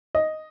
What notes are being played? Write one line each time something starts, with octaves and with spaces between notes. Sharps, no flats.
D#5